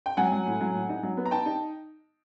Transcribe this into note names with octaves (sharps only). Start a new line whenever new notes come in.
G5
F#3 F#5 G#5
F#3
A2
F#3
A2
D#4
F#3
B3
A#5
D#4 G5 A5
D#4